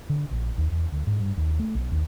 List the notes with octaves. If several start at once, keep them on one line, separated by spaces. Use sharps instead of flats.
D3
A#1
D#2
E2
D2
G#2
G2
D#2
A3
B1
D#2